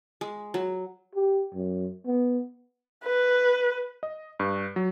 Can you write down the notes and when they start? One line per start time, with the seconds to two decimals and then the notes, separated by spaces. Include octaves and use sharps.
0.21 G#3
0.54 F#3
1.15 G4
1.54 F#2
2.06 B3
3.05 B4
4.03 D#5
4.39 G2
4.76 F#3